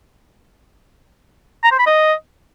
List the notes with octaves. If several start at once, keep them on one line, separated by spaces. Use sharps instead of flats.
A#5
C5
B5
D#5